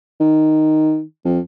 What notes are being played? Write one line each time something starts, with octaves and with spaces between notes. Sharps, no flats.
D#3
F2